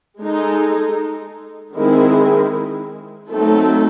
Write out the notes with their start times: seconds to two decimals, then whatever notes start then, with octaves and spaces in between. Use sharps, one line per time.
0.20 G#3 D#4 A4
1.75 D#3 G#3 C4 E4 G#4
3.29 F#3 A3 C4 D#4 A4